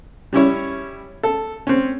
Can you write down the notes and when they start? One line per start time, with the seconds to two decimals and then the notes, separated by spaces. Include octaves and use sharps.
0.33 G3 C#4 E4 C#5
1.23 A4
1.67 C4 C#4